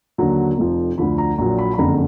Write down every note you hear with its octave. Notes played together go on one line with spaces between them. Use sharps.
D#2 D3 F#3 A#5
F1 F2 F3
D2 D3 F3 B5
A#5
A#1 A#2 F#3 A#5
B5
B5
F#1 F2 D3 A#5